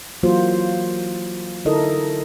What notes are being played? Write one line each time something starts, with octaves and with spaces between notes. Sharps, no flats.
E3 F#3 A#3 F4 F#4 C5
D3 D#4 E4 A4 A#4 D#5